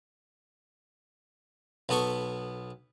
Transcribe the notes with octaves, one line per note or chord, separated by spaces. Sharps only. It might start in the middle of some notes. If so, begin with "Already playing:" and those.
B1 B3 A4 C#6